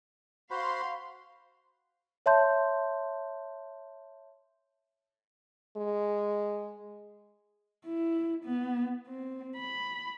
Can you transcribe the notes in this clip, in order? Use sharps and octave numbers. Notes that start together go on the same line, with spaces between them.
F#4 C5 F5 B5 C6
C#5 E5 A5 C6 G6
G#3
E4
B3
C4
B5